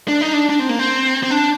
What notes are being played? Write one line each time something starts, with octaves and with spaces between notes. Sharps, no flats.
D4
D#4
D4
D4
C4
A#3
C4
C4
D4